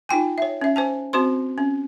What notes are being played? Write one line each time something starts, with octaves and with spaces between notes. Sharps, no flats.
D#4 F4 G5 G#5
C#5 E5
C#4 E5
C5 G#5 A5
C4 F#4 C5 C6
C#4